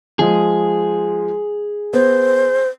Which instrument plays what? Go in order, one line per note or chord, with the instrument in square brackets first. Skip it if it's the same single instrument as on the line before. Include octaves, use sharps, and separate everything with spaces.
[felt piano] F3 G#3 [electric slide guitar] G#4
[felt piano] B3 [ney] C5